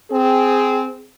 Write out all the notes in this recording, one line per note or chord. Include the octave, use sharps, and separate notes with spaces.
C4 G#4